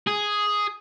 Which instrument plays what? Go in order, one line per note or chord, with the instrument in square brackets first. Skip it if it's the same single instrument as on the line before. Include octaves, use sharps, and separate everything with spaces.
[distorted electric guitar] G#4